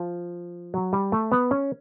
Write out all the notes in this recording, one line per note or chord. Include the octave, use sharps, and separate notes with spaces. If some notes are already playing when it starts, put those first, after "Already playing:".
Already playing: F3
F#3
G3
A3
B3
C#4